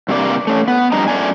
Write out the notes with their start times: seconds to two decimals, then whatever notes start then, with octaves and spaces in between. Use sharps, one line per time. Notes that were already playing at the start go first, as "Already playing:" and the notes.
0.09 G2 C3 A#3 D5
0.47 A3 C#4
0.68 B3
0.92 F2 G3 D4 D#5 A#5
1.08 F#2 A3 D5 G#5